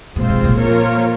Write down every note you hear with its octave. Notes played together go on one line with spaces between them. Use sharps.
A#2 G#3 C4 F4 C5
C3
A#2
F3 A#3 F4 A#4 C#5